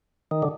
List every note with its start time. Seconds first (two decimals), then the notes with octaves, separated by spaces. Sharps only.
0.31 D#3
0.42 D3